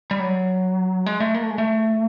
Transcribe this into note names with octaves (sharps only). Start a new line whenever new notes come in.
G3
F#3
G#3
A3
A#3
A3
G#3
A3